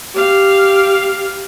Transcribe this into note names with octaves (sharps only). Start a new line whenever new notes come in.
G4 F5